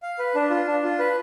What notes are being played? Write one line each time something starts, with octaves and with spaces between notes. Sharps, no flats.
F5
B4
D4
F4
D4
F4
B4